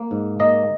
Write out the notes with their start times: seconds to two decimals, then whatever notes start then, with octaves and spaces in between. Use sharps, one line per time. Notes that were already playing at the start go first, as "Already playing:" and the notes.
Already playing: A#3
0.11 G#2
0.40 A#3 D#5